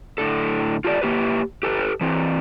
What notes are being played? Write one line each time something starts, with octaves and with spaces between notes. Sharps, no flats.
A2 D3 A4
F4 G4 A4 C#5 D5
A#3 G4 B4
G4 A4 B4
E3 C4